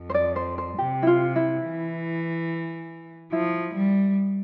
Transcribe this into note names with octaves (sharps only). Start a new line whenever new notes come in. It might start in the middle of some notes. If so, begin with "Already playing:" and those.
Already playing: F2
C5
D5
C5
C5
C3 G4
E4
F4
E4
E3
F3 E4
G3